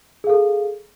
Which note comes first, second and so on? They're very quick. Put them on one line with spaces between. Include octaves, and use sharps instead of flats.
G#4 F5 A4